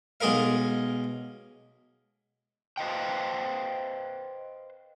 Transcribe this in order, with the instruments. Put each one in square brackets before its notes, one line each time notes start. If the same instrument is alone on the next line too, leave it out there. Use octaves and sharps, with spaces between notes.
[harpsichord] B1 G#3 G#4 A#4 F5
[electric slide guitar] B4 C5 D#5 F5 G5